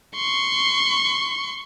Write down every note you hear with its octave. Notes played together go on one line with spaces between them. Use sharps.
C6 C#6